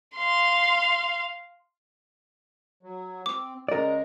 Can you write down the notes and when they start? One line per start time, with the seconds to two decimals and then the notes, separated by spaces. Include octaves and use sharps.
0.16 F5 C6
2.83 F#3
3.26 C4 D6
3.68 C#3 G#3 A#4 D5